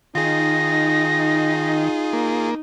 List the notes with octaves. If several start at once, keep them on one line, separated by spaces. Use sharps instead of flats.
D#3 D#4 F4 G#4 A#6
A#3